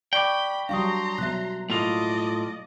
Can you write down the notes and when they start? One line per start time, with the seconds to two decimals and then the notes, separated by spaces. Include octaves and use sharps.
0.13 D5 G5 B5 C#6 D6
0.69 F#3 G3 D4 F5 A#5 C6 C#6 D#6
1.18 B2 F#3 E5 F#6
1.70 A2 A#3 F4 D5 D#5